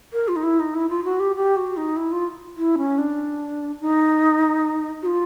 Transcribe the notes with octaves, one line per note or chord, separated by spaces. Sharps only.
A#4
F4
D#4
E4
D#4
E4
F4
F#4
G4
G4
F#4
D#4
E4
F4
E4
C#4
D4
D#4
F#4
F4